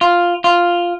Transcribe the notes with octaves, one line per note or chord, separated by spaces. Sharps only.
F4
F4